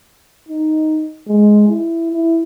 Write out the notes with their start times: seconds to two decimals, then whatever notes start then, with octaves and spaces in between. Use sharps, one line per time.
0.49 D#4
1.28 G#3
1.69 E4
2.12 E4